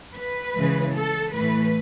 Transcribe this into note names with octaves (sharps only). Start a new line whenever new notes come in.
B4
C#3 E3 G#3
A4
A2 E3 A3 B4